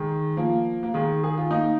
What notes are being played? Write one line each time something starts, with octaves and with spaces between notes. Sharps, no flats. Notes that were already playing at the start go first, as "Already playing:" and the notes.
Already playing: D#3 G#3
F3 A#3
A#3
D#3 G#3
G#4
F4
A#3 D#4